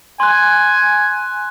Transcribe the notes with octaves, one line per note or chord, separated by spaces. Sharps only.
G#5 C6 F#6